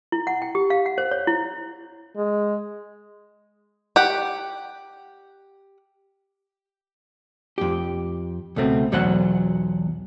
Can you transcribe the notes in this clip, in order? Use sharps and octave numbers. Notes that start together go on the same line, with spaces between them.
E4
F#5
G5
G4
F5
F#5
C5
C#5
E4
G#3
G4 F#5
F2 G4
C#2 B2 A3 C4
B1 E2 F#3 C5 F#5